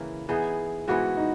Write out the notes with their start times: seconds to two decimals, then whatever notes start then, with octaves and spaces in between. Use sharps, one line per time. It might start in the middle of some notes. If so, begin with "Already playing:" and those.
Already playing: C#3 E3 A#3 E4
0.29 E3 B3 D#4 G#4
0.88 G#2 E3 B3 E4 F#4
1.17 D#4